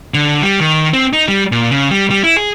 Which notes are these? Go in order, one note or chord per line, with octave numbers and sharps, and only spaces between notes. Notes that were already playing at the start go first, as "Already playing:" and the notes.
D3
G3
D#3
C4
D#4
G3
A#2
C#3
G3
G3
E4
G#4